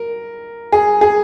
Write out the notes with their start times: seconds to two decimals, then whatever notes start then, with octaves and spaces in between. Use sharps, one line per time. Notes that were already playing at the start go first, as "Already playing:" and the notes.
Already playing: A#4
0.72 G#4
1.01 G#4